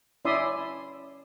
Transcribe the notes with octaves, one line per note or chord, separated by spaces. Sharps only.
C#4 E4 D5 E5 C6 D#6